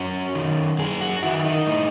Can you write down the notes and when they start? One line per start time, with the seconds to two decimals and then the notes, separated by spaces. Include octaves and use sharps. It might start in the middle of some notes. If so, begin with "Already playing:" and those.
Already playing: F#2 C#4
0.35 D#3
0.79 F#2 G#4
1.01 F#4
1.23 D#3 E4
1.45 D#4
1.67 A2